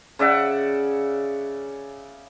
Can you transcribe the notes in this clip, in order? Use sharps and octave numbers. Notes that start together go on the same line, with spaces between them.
C#3 D5 E5 F#5